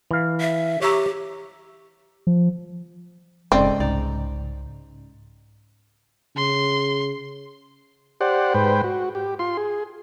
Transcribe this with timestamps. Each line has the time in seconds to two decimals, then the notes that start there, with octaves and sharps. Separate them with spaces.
0.11 E3 F5
0.40 E5
0.81 G4 C#5 E5 A#5
2.27 F3
3.52 F1 G#2 C#3 C4 A4 D5 D#5
3.80 C2 D#4 D5 A#5
6.36 C#3 C6
8.21 G4 C5 D5 F#5
8.54 G#2 B4 C5 G5
8.84 F#4
9.15 G4
9.39 F4 C6
9.57 G#4